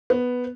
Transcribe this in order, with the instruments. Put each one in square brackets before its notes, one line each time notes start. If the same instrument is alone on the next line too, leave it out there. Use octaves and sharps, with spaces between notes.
[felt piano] B3